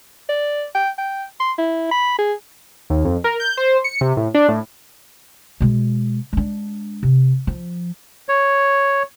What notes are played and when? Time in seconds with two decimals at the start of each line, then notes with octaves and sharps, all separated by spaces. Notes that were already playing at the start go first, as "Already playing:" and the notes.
0.29 D5
0.75 G5
0.98 G5
1.40 C6
1.58 E4
1.91 B5
2.19 G#4
2.90 D#2
3.05 F2
3.24 A#4
3.40 G6
3.57 C5
3.84 C#7
4.01 C3
4.17 A2
4.34 D4
4.48 A2
5.60 B2 G#3
6.33 G#3 D4
7.03 C3
7.47 F3
8.29 C#5